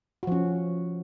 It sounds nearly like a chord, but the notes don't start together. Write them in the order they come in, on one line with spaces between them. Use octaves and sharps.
F#4 F3 C#4